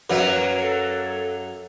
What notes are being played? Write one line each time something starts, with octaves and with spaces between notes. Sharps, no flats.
F#2 F#3 A#3 B4
A4